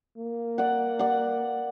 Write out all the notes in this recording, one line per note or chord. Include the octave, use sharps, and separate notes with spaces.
A#3
D5 F#5
D5 F#5